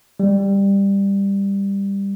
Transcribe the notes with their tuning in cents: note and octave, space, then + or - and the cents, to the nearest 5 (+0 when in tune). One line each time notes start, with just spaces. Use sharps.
G3 +15